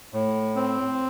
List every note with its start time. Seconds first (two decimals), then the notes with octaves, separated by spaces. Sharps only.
0.13 A2
0.56 C4